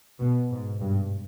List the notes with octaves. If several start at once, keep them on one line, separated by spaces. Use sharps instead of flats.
B2
G#2
G2